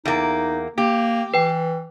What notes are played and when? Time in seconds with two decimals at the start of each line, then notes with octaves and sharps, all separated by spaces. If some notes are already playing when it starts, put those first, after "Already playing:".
0.05 E2 A#3 D#4
0.78 A#3 G4
1.34 E3 B4 G5